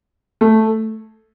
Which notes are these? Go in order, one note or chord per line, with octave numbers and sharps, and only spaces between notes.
A3